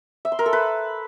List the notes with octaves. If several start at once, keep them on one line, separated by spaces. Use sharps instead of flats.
E5
C6
A#4
A4
B4